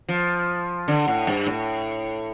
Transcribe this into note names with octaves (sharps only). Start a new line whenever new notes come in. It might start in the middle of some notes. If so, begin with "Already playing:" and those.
F3
D3
A2
G2
A2